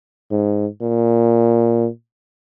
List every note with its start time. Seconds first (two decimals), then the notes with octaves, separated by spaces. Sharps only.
0.31 G#2
0.82 A#2